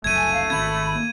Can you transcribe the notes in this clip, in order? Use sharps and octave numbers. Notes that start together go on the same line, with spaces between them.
F#1 C2 F#2 A3 G#6 D#7
G#5
F5
G#1 D#3 C4 B5 G#6
A#3